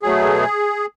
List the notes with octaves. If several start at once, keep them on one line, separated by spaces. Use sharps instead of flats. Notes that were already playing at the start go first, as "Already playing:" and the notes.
B2 F#3 A3 G#4